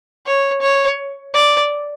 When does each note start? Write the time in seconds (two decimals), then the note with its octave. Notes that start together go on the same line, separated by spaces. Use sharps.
0.26 C#5
0.61 C#5
1.34 D5